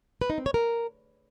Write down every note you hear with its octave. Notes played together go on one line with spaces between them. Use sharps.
B4
D#4
C4
C#5
A#4